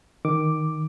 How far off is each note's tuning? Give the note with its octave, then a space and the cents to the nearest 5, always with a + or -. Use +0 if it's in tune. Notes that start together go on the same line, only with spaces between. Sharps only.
D#3 +0 D6 +0